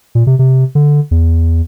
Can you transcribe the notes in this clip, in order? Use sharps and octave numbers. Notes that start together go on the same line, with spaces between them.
A#2
C3
C3
D3
E2